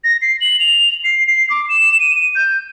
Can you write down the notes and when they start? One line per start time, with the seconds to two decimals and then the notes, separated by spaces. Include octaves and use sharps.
0.04 A#6
0.22 C7
0.41 F#7
0.60 F7
1.04 C7
1.27 C7
1.50 D6
1.69 E7
2.00 D#7
2.35 G6